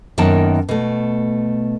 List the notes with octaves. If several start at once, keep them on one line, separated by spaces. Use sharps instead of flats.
F#2 D#3 A#3 B3 A#4 A5
B2 A3